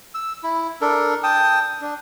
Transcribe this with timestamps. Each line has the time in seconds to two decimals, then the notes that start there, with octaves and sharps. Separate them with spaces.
0.15 E6
0.43 E4
0.81 D4 A4 A#4
1.23 G5 A5 D#6
1.81 D4